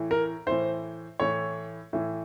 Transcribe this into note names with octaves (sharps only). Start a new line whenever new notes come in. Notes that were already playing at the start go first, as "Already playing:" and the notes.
Already playing: A2 E3
A#4
A2 E3 C5
A2 E3 C#5
A2 E3